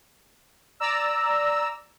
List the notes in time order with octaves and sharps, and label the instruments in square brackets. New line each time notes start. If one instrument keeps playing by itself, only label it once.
[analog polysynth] D5 A#5 E6